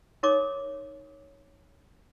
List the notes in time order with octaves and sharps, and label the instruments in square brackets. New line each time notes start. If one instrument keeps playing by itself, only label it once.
[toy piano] D#4 A#4 C#5 D6